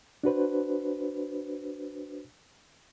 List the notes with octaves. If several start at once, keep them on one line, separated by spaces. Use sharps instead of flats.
D4 F#4 B4 C5